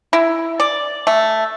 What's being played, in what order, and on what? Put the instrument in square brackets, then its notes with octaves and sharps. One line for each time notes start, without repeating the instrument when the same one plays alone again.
[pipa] E4
D5
A3